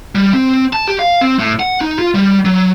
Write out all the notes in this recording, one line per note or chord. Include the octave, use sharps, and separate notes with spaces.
G3
C4
A5
G4
F5
C4
A2
F#5
D#4
F4
G3
F#3